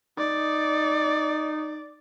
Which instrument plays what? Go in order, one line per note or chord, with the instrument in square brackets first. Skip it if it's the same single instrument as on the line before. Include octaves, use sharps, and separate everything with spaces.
[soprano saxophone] D#4 [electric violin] D5